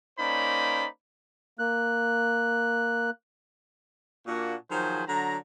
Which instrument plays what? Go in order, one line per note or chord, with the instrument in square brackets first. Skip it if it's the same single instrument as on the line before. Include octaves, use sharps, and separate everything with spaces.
[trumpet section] A#3 C#4 D#4 C5 D5 B5
[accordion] A#3 F#6
[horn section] A#2 A#3 D4 F#4
D#3 F3 F#3 G#4 C5
D3 F#3 A#5